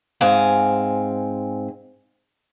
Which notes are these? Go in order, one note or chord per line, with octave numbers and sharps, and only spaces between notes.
G#2 C4 F5 G#5